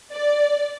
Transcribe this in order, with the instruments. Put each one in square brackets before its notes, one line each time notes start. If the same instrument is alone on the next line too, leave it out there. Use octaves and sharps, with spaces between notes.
[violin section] D5